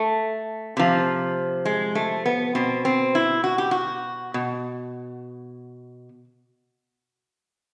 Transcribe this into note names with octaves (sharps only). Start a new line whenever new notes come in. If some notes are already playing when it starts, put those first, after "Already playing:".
Already playing: A3
C3 F3
G#3
A3
B3
B2 C4
C4
E4
F#4
G4
F#4
B2